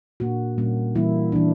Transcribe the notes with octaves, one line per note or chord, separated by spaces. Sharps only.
A#2 A#3 D4 F#4
A#2 G3 A#3 C#4
E3 G3 A#3 E4
E3 A#3 D4